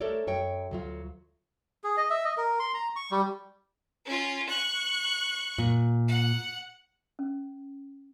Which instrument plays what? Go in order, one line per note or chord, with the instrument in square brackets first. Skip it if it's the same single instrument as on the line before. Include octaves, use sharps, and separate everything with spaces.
[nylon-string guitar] A3 A4 A#4 C#5 D5
F#2 A#4 C#5 G5
D2 F#3 F4
[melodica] G#4
D#5
E5
D#5
A#4
C6
A#5
C#6
G3
[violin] C#4 F4
C#6 F#6
[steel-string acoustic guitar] A#2
[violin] F#5
[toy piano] C#4